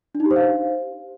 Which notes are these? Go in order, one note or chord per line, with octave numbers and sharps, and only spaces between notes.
D4
D#4
G4
C5
F5